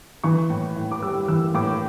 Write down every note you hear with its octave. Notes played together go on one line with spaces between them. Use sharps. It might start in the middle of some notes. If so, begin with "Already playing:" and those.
E3 C#6
A2
A2
D6
G3 E6
E3 E6
A2 D6